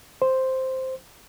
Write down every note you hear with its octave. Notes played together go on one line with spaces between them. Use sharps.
C5